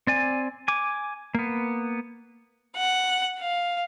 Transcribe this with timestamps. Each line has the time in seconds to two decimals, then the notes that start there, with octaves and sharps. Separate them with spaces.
0.07 C4 D5 G#5
0.68 G#5 D6
1.35 A#3 B3
2.78 F#5
3.41 F5